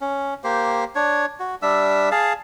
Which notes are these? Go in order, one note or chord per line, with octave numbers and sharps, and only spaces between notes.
C#4
A#3 G4 C5
D4 C#5
F#4
G3 D4 E5 E6
G#4 F5 A5